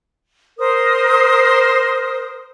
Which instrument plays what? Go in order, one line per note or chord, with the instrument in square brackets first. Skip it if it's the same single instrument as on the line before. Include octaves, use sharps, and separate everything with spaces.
[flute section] A#4 C5 D#6